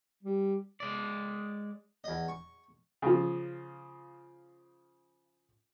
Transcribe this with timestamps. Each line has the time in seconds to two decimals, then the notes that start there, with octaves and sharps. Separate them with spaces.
0.23 G3
0.80 G#3 D5
2.04 E2 D#5
2.28 C#6
3.02 C#3 F3